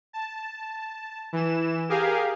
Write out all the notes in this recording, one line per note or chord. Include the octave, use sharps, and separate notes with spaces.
A5
E3 E7
G4 G#4 A#4 F5